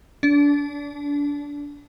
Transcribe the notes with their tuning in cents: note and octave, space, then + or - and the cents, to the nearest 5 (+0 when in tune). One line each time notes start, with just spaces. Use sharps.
D4 -25